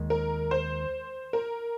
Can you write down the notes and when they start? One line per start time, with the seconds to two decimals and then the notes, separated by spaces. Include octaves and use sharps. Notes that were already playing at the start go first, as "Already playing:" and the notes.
Already playing: D#2 D#3 G#3
0.10 A#4
0.51 C5
1.33 A#4